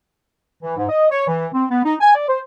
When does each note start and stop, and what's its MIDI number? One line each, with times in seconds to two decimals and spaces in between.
0.63 0.77 52
0.77 0.85 44
0.89 1.06 75
1.11 1.27 73
1.27 1.48 52
1.53 1.65 60
1.71 1.84 59
1.84 1.96 63
2.01 2.13 80
2.15 2.26 74
2.28 2.40 72